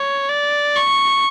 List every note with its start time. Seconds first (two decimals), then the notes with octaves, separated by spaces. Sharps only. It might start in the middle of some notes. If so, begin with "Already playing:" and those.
Already playing: C#5
0.29 D5
0.75 C#6